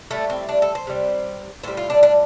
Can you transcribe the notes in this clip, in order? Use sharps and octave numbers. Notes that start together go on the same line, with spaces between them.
A2 G3 A3
C4
D4
A4
C5
C3 G3
A2 G3 C5
F4
D4
D4